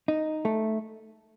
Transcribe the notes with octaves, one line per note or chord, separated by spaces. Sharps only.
D#4
A3